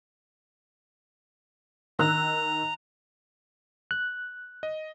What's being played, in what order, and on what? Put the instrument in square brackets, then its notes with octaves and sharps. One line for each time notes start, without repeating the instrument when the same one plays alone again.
[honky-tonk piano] D#3 E6 F#6 [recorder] A#5
[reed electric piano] F#6
[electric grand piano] D#5